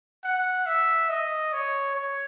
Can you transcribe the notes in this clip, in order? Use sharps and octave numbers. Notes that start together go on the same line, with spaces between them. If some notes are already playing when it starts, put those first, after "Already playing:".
F#5
E5
D#5
C#5
C#5